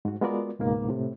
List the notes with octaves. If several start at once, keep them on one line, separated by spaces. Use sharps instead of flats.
G#2 F#4
G#3 B3 F4 F#4 A#4 D5
C#2 G#2 B2 A#3
A2 C3